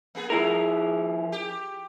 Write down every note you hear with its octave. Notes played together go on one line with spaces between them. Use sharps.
A#3 B3 G#4
F3 E4 G#4 A#4
G4